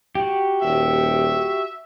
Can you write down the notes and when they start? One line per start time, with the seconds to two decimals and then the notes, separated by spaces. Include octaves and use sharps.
0.15 F#4 G4
0.62 D#1 E5